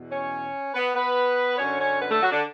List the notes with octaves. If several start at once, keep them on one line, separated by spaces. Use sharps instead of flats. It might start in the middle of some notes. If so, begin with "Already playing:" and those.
Already playing: E2 B2
C#4 C#5
B3 B4
B3 B4
F#2 D3 C#4 C#5
C#4 C#5
B3 B4
A3 A4
F#3 F#4
D3 D4